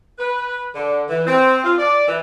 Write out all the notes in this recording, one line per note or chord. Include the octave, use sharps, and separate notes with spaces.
B4
D3
E3
C4
F4
D5
E3